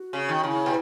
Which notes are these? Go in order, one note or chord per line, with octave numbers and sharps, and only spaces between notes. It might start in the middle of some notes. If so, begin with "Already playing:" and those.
Already playing: F#4
C#3
D#3
C#3 E4
B2